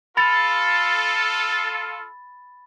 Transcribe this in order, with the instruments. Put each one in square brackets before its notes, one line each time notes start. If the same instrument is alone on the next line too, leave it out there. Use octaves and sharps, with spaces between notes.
[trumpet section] F4 A4 [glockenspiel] B5 A6